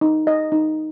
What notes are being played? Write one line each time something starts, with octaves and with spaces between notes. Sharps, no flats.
D#4
D#5
D#4